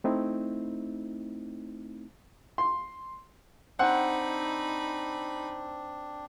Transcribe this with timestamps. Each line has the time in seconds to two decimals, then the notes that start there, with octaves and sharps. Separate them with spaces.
0.04 A3 C4 D#4 E4
2.58 C6
3.79 C4 D4 D#4 F#5 B5